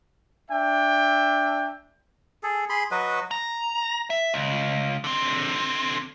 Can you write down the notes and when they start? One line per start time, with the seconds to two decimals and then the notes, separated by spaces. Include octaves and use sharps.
0.51 D4 E5 G5
2.43 G#4 A4
2.70 G#4 B5 C6
2.91 F#3 F#4 B4 D#5
3.31 A#5
4.10 E5
4.34 C#2
5.04 D3 C4